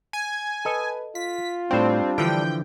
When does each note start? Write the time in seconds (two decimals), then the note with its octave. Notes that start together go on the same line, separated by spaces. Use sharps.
0.13 G#5
0.65 A4 B4 D#5
1.15 F4 B6
1.71 A2 G3 C4 D4 C5
2.18 D3 E3 F3 G5